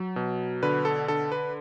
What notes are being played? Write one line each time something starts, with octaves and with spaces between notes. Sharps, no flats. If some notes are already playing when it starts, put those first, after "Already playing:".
Already playing: F#3
B2
D3 B4
A4
D3 A4
B4